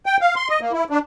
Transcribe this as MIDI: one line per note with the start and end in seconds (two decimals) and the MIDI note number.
0.06 0.17 79
0.21 0.35 77
0.36 0.48 84
0.49 0.60 75
0.61 0.72 58
0.72 0.84 64
0.90 0.99 62